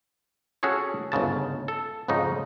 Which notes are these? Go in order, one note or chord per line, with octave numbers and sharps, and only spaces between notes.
C#4 F#4 G#4 A4 C#5
G1 G#2 C#3 A5
A4
F2 G#2 C#3 D#4